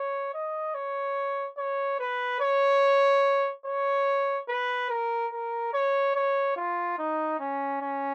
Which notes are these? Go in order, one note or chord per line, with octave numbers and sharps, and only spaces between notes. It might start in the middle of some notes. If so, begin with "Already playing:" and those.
Already playing: C#5
D#5
C#5
C#5
B4
C#5
C#5
B4
A#4
A#4
C#5
C#5
F4
D#4
C#4
C#4